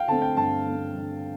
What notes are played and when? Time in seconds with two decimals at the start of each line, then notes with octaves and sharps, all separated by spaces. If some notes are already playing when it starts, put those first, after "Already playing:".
Already playing: F5 G5
0.08 D3 A3 C4 A5
0.22 G5
0.37 G2 A5
0.66 D3 A3 C4
0.95 G2